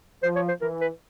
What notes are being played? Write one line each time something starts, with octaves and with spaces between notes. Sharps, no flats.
F3 C5
C#5
C5
E3 A#4
B4